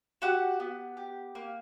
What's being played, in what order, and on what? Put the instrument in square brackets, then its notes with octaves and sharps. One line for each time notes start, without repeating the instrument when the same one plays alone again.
[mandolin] F#4 G4 F#5
B3
G4
A#3